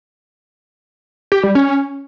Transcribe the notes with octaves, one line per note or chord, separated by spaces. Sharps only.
G4
G3
C#4